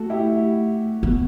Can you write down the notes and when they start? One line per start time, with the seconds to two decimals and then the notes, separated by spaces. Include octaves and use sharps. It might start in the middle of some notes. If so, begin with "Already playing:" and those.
Already playing: A3 F#4 A4
0.10 E4 G4
1.03 B3